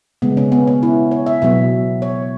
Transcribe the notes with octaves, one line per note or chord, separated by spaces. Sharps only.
C#3 G#3 B3
C#4
B3
C#4
E4
C#5
E5
B2 F#3 B3 E5
C#5